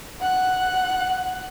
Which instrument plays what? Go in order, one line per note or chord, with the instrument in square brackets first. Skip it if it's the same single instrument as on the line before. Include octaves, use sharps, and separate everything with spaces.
[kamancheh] F#5 F#6